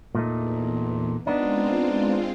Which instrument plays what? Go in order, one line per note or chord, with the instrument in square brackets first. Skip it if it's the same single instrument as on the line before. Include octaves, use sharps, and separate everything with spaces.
[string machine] E2 [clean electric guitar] A#2 A3 D#4
[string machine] G#3 C4 F4 [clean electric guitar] B3 D#4 [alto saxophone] D4